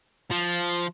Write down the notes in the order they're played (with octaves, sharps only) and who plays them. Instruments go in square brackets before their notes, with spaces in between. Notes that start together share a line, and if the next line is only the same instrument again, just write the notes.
[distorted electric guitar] F3